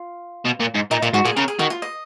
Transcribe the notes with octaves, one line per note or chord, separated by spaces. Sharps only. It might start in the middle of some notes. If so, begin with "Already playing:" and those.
Already playing: F4
B2
A#2
G#2
A#2 D#4
A#2 F4
G#2 F#4
A#2 G#4
C#3 A#4
G#4
D#3 F#4
F4
D#5